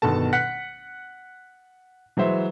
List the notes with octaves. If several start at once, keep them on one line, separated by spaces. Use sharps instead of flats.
G1 B2 D#3 A4 A5
F#5 F#6 B6 C#7
E3 F#3 G#3 C5 E5